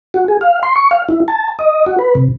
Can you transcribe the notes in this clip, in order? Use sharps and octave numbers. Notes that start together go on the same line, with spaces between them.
F#4
G#4
F5
C6
C#6
F5
E4
A5
D#5
F#4
B4
C3